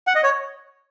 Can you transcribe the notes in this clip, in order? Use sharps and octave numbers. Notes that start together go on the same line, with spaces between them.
F#5
D#5
C#5